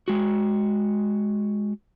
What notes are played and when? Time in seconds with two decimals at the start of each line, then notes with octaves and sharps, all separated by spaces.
0.08 G#3 F#4